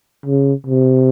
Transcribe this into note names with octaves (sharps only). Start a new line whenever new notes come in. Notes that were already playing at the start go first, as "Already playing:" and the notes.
C#3
C3